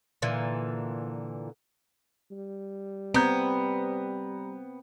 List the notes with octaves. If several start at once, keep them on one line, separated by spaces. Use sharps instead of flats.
A#2 D3 E3
G3
B3 C4 A#5 G6 G#6